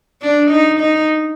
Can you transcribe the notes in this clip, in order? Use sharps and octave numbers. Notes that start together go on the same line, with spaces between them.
D4
D#4
D#4